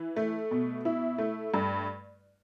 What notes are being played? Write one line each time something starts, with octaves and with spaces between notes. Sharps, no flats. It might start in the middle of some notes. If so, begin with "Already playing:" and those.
Already playing: E3
A3
B2
E4
A3
G2